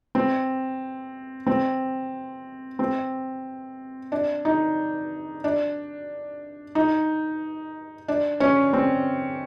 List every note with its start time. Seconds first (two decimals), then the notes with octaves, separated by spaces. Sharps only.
0.15 C4
1.47 C4
2.79 C4
4.12 D4
4.45 D#4
5.44 D4
6.75 D#4
8.08 D4
8.40 C#4
8.73 C4